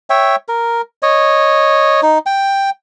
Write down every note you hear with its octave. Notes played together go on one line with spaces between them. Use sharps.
C#5 E5 G5
A#4
C#5 D#5
D#4
G5